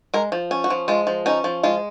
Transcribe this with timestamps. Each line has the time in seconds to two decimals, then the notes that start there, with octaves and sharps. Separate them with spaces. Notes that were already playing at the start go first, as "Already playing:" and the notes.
0.14 G#3 A#4
0.32 F3
0.51 C#4
0.64 F#4
0.70 F3
0.88 G#3 F4
1.07 F3
1.26 C#4 D#4
1.44 F3
1.63 G#3 F4